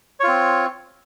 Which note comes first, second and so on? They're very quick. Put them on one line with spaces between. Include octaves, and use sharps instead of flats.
C#5 F4 C4